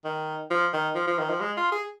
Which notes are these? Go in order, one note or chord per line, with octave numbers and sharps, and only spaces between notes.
D#3
F3
D#3
F3
F3
D#3
F3
G#3
F4
G#4